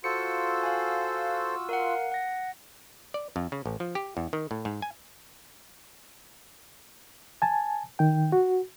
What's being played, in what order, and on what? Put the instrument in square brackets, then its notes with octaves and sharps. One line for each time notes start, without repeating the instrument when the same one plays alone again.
[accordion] F4 F#4 E6 [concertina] A4 C5 [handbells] C#7
[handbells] F5 G#5
A#4 F5 F#5
F#5 A#6
[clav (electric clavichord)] D5
F2
C#3
A1
F3
G4
E2
D#3
A2
G#2
G#5
[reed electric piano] G#5 A5
D#3 G5
F#4